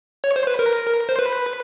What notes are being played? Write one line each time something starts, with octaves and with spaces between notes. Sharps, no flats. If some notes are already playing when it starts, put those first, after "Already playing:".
C#5
C5
B4
A#4
C5
B4